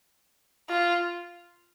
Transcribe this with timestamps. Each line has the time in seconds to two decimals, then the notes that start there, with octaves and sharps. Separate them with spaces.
0.69 F4